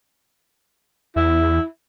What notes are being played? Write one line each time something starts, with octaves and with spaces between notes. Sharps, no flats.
E2 E4